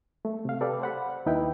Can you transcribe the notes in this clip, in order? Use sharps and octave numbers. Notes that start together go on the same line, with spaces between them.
A3
C3 F5
G4 A4 B4 D5
C5 F#5 B5
D#2 D#4 E4 B4 G5